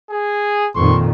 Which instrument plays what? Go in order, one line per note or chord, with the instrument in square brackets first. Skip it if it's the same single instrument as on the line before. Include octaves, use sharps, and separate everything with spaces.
[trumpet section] G#4
[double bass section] F2 A#2 D#3 [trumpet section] C6 C#6